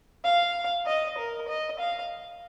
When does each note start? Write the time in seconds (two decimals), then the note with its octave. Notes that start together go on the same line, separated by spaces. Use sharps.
0.24 F5
0.86 D#5
1.18 A#4
1.48 D#5
1.79 F5